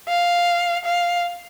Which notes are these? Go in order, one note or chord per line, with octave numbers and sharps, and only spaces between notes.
F5
F5